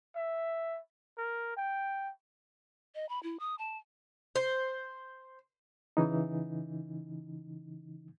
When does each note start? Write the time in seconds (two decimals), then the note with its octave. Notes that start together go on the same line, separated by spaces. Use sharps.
0.16 E5
1.18 A#4
1.56 G5
2.95 D#5
3.09 B5
3.23 E4
3.40 D#6
3.59 A5
4.36 C5
5.97 C#3 E3 D#4